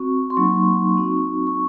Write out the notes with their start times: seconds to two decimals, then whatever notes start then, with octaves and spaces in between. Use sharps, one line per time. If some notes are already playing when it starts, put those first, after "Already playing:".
Already playing: C4 F#4 C#6
0.30 C6
0.37 F#3 A#3 D#4 C#6
0.97 C4 D#4 F#4
1.47 C#6